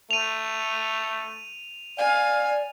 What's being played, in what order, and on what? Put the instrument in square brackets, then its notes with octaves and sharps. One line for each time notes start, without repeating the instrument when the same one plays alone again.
[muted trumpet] A3 [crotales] D#7 F7
[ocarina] D5 [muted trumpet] F5 [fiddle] G#5